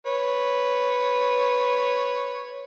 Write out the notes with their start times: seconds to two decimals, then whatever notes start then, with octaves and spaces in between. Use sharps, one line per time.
0.06 B4 C#5